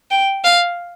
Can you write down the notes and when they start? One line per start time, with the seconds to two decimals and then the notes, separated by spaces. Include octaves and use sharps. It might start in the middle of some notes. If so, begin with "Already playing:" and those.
0.11 G5
0.44 F5